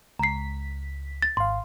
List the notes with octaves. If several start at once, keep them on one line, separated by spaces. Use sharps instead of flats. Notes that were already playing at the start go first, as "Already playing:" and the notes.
C#2 A#5 B6 C7
A6
G#1 F5 C6